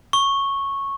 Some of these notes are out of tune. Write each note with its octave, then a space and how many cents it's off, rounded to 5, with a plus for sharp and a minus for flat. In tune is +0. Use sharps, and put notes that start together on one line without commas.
C#6 -10